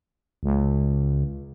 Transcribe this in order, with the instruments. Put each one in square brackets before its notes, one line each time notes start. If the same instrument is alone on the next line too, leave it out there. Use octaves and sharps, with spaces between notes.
[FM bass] C#2